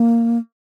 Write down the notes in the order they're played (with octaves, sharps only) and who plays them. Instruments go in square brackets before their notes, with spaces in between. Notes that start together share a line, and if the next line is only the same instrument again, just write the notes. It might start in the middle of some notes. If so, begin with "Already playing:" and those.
Already playing: [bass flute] A#3